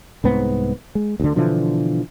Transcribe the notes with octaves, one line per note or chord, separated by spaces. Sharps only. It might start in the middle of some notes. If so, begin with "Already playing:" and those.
C2 G#2 B3 C4
G#3
D2 D3
B2 D3 E3 F3